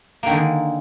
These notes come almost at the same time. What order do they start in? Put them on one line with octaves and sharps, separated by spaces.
A#3 D#3 D3 G#3